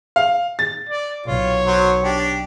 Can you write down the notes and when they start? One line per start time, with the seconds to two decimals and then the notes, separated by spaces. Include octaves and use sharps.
0.16 F5
0.59 A6
0.89 D5
1.26 B1 F4 C#5
1.67 F#3 C5
2.04 D4 G4